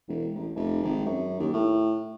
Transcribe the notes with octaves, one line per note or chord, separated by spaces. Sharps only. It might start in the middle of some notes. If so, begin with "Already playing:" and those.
E1
A1
F1
G#1
F#2
D#2
A2